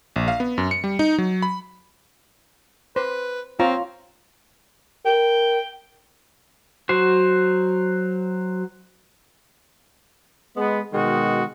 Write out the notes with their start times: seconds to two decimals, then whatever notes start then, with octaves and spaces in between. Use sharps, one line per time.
0.16 A#1
0.28 F5
0.40 B3
0.58 F#2
0.71 C#7
0.84 G3
0.99 D#4
1.18 F#3
1.42 B5
2.96 B4 C5
3.60 C4 F4 C#5 A#5
5.06 A#4 G5
6.89 F#3 F#4 C5
10.57 G#3 B3
10.93 B2 D#3 G#3 F#4